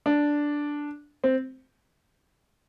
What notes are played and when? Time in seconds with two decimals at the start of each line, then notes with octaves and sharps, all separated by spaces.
0.06 D4
1.24 C4